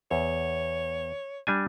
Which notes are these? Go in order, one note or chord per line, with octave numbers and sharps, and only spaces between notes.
E2 C#5
G3 D4 G#5